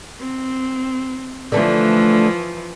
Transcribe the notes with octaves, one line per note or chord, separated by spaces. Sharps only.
C4
D3 E3 F3 A3